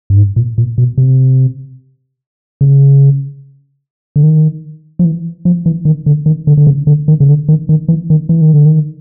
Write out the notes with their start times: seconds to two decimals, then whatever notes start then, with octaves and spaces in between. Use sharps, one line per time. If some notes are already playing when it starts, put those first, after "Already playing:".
0.10 G2
0.17 G#2
0.36 A#2
0.58 A#2
0.78 B2
0.98 C3
2.61 C#3
4.16 D3
4.23 D#3
4.99 F3
5.05 E3
5.45 F3
5.66 E3
5.85 D#3
6.06 D3
6.26 D#3
6.47 D3
6.57 D3
6.67 C#3
6.87 D3
7.08 D#3
7.20 C#3
7.28 D3
7.49 D#3
7.69 D#3
7.89 E3
8.10 D#3
8.29 E3
8.41 D#3
8.54 D3
8.65 D#3